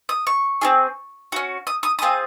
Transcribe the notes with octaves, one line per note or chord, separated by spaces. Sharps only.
D#6
C#6
C4 F4 G#4
C#4 F#4
D#6
D#6
C4 F4 G#4 D#6